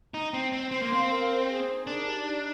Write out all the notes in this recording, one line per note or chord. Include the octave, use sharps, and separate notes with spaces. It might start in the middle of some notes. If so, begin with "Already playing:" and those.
D#4 A#5
C4 G5
C4 C5
C4 C6
A#3
C4 F5
A#4
C5
G#4
D#4
D4 A#4
G4
D#4